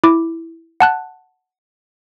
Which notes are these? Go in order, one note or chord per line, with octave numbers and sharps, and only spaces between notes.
E4 D6
F#5 A5 F#6